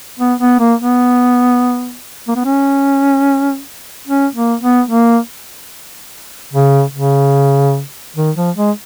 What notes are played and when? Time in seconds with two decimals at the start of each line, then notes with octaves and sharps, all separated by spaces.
0.20 B3
0.40 B3
0.60 A#3
0.80 B3
2.28 A#3
2.36 B3
2.45 C#4
4.08 C#4
4.35 A#3
4.62 B3
4.89 A#3
6.53 C#3
6.94 C#3
8.16 D#3
8.36 F3
8.57 G#3